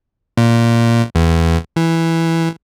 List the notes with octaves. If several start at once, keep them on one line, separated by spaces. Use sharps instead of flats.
A#2
E2
E3